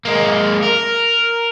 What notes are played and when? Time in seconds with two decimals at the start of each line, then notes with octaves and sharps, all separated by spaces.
0.05 G#3 A#3
0.63 A#4